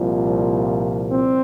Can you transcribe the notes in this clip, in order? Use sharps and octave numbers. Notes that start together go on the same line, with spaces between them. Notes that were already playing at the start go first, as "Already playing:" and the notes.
Already playing: C2 A#2 F3
C4